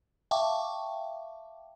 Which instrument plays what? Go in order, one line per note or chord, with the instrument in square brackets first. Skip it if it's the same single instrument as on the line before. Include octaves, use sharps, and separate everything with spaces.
[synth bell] E5 F5 G5 A5 C#6 D6